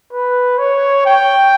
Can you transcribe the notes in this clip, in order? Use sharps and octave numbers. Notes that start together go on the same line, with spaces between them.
B4
C#5
G5